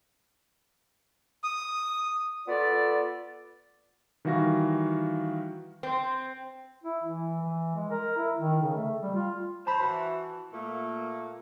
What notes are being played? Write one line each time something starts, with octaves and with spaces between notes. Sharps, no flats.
D#6
B3 F4 A4 D5
D#3 E3 G3 F#4 F5 A#6
C4
E4
E3
E3
G#3
A#4
E4
D#3
C#3
A3
G3
F4
C5 A5 B5
E3 F#4
A#2 A3 A#3